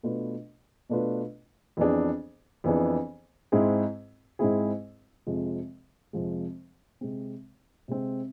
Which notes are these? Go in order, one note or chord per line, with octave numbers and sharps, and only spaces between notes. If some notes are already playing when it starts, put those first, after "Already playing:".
B2 A3 D4 F4 B4
B2 A3 D4 F4 B4
F2 E3 B3 D4 G#4
F2 E3 B3 D4 G#4
G#2 G#3 C4 E4 G#4
G#2 G#3 C4 E4 G#4
F2 C3 F3 G#3
F2 C3 F3 G#3
C3 G#3 C4
C3 G#3 C4